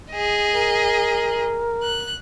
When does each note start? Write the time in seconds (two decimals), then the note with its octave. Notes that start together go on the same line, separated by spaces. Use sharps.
0.12 G#4 D#5
0.55 A#4
1.83 F#6